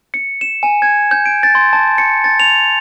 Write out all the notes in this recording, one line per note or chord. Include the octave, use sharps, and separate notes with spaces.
C#7
E7
G#5
G#6
G6
D7
A6
C6
A5
C#7
A6
F7